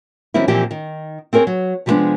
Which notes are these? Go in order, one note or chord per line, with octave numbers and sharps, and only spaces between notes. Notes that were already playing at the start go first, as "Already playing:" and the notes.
D#3 F#3 G3 C4 C#4 E4
A#2 E3 F3 C4 G4
D#3
C4 G#4 A#4 C5 C#5
F#3
C3 F3 G3 G#3 B3 D4